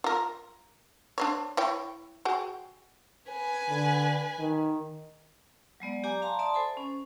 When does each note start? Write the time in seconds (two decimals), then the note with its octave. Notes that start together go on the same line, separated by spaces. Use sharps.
0.04 F4 A#4
1.18 D4 C5 C#5
1.57 E4 C#5 G5
2.25 F#4 G#4 G5
3.31 B4 G#5
3.69 D3
4.39 D#3
5.80 F#3 G#3 B3 D5
6.04 G4 D5 G#5 A#5 D6
6.22 F5 A5 A#5 C6
6.39 D5 E5 A5 C6 D#6
6.54 A4 C5 G#5 B5
6.77 C#4